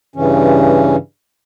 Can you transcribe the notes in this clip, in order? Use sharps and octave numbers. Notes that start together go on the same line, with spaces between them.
G2 C#3 E3 C#4